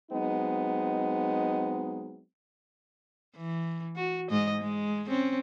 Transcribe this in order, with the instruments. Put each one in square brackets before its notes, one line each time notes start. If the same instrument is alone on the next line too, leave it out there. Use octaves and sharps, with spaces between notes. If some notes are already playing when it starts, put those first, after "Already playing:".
[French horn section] F#3 G#3 B3 C4 D#4
[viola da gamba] E3
F#4
G#2 G#3 D#5
G#3
C4 C#4